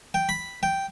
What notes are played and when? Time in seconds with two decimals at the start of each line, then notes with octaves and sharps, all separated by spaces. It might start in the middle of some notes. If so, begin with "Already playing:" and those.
0.14 G5
0.29 B5
0.63 G5